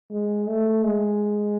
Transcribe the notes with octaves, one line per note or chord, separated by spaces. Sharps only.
G#3
A3
G#3